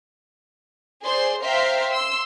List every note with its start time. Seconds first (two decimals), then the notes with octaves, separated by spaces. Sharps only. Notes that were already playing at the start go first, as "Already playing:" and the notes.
1.04 G#4 C5 D5 C6
1.43 C5 E5 F5 G5 A#5 C6
1.91 C6 E6